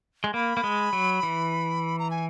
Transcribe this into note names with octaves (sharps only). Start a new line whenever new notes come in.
G#3
A#3 B5
A#3
G#3
F#3
E3
A#5
G#5